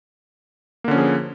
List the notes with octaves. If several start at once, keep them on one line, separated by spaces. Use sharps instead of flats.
D3 F3 A#3 C#4 G#4